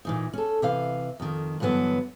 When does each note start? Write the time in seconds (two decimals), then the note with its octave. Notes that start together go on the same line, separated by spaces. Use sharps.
0.05 A#2 E3 D#4
0.33 C#4 A4
0.62 C3 E3 F5
1.20 F2 D#3
1.60 G2 D3 E3 F#3 B3